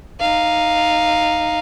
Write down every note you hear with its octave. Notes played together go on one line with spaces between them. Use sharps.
D#4 F5